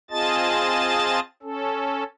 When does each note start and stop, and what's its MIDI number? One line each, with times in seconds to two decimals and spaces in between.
0.11 1.20 60
0.11 1.20 65
0.11 1.20 68
0.11 1.20 75
0.11 1.20 81
0.11 1.20 93
1.43 2.04 61
1.43 2.04 69